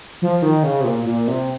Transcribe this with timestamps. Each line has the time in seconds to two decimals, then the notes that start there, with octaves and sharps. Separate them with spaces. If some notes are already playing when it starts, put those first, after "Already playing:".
0.22 F3
0.42 D#3
0.63 C#3
0.80 C3
0.84 A#2
1.05 A#2
1.28 C3